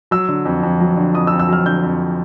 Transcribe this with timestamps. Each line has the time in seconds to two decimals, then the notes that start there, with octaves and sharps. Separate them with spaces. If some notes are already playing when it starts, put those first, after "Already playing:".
0.11 F#3 E6
0.29 D3
0.45 F2
0.63 F2
0.80 F#3
0.97 D3
1.14 F2 D#6
1.27 E6
1.32 F2
1.40 E6
1.48 F#3 F6
1.65 D3 G6
1.83 F2